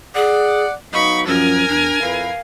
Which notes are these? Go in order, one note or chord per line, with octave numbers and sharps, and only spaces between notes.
G#4 D5 F#5
F#3 B3 D#4 F5 B5 C#6
F#2 F3 C#4 A#4 G#5
E2 D4
F2 E4 B4 F5